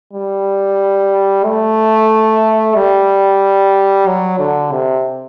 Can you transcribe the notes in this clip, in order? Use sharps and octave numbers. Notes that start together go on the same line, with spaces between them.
G3
A3
G3
F#3
D3
C3